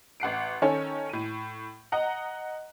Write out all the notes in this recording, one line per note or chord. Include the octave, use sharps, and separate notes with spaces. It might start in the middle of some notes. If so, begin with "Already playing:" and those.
A1 F#5 C7 D7
D#3 C#4 A4 C#5
A2 D#7
D#5 F#5 A#5